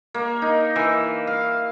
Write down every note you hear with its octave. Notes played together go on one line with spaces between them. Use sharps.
A#3
D#4
E3
F5